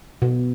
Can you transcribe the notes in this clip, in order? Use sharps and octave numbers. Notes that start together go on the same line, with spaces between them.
B2